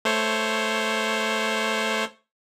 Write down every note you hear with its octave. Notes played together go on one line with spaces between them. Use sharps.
A3 C5 C#5